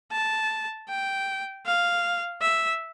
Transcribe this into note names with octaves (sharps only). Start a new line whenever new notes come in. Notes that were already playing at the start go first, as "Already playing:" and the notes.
A5
G5
F5
E5